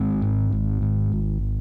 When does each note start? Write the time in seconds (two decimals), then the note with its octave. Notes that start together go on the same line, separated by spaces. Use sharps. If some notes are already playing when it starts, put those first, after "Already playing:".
Already playing: G#1 G#3 C4
0.22 G#2
0.52 G#1
0.82 G#2
1.12 G#1